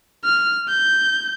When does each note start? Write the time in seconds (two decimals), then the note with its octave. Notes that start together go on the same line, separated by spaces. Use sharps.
0.24 F6
0.69 G6